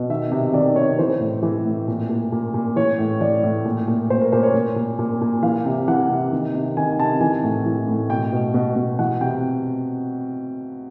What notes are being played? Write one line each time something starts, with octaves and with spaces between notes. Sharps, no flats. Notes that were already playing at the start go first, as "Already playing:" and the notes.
Already playing: B2
D#3 E5
C3
D#3 D5
C3 C#5
E3 C5
A2
E3
A2
A#2
A#2
A#2
A#2
E3 C#5
A2
E3 D5
A2
A#2
A#2
A#2 C5
A#4
A#2 C5
C#5
A#2
A#2
A#2
A#2
E3 F5
C3
E3 F#5
C3
D#3
C3
D#3 G#5
C3 A5
E3 G#5
A2
E3
A2
B2 G5
B2
B2
B2
E3 F#5
C3 G5